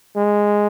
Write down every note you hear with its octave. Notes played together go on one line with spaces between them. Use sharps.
G#3